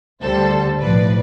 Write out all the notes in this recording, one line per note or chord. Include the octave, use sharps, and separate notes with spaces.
D2 D3 G3 A4 C5
B1 A2 F3 B4 D5